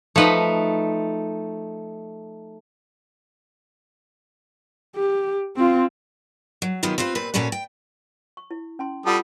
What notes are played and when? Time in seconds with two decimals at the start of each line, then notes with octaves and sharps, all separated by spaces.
0.16 F3 A3 D#4 B4 D#5
4.96 G4
5.56 C4 F4
6.62 F#3
6.83 D#3 F#3 B3 F4 G4
6.98 C4 F4 B4 C5
7.15 A#2 C4 B4
7.34 A#2 F#3 C#4 A4 B4 C#5
7.52 G5
8.37 C#6
8.51 E4
8.79 C#4 A5 C6
9.06 G3 F4 A4 F#5 B5 D#6